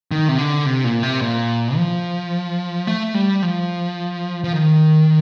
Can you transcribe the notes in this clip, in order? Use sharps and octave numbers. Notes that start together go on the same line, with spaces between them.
D#3
C3
D3
C3
A#2
C3
A#2
F3
A3
G3
F3
F3
D#3